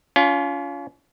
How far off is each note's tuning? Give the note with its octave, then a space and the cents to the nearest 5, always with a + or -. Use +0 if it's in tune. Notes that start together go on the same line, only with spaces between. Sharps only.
C#4 +35 F4 +0